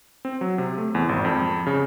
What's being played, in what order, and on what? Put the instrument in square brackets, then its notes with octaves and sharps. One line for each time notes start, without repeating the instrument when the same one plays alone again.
[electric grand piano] C4
F#3
C3
A3
E2
G#1
F2
C#3